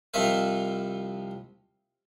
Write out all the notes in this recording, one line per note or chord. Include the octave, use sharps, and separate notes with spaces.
C2 F3 D#4 E5 F5